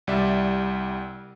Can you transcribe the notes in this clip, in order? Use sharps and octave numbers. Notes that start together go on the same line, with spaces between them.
C2 G3 D5 E5